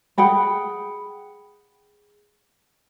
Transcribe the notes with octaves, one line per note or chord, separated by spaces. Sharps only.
G#4 F#5 G5 B5